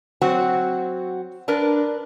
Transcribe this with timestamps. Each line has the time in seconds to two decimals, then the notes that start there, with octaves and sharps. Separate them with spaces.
0.21 F#3 C4 F#4
1.48 D4 A#4 B4